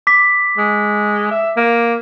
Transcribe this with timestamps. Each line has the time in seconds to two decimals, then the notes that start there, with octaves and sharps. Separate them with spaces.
0.07 D6 B6
0.57 G#3
1.31 E5
1.57 A#3